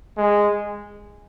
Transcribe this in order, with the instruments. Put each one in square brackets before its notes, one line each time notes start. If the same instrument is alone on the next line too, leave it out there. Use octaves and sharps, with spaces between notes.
[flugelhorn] G#3